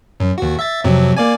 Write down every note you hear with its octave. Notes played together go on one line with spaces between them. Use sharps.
F#2
D#2 F#4
E5 A6
F2 C3 F#3
A#3 D5 G#5